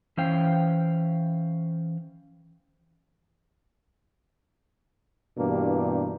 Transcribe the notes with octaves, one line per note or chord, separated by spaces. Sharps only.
E3 C#4 C5 F5 G5
G2 B2 E3 A#3 D4 G4